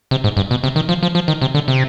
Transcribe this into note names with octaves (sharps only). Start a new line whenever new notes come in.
C3
G#2
G2
B2
C3
D#3
F3
F3
F3
D#3
C3
D3
C3